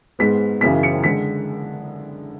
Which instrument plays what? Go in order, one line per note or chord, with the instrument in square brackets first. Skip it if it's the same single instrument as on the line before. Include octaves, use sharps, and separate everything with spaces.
[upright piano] G#2 G#3 B3 B6
F#1 F#2 C#3 E3 B6
C#7
D3 G#3 B6